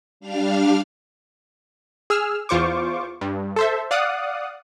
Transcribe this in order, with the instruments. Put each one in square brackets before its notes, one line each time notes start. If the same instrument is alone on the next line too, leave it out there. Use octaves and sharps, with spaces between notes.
[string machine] G3 D4 F5 F6
[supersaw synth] G#4 E6 F6
E2 F4 C5 C#6 D6
G2
A4 C5 E5
D5 F5 F#5 D#6 F#6